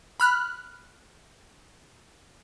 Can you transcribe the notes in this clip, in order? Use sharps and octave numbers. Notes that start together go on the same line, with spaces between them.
B5 F6 F#6